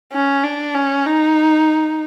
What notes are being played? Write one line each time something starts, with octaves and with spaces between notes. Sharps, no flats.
C#4
D4
C#4
D#4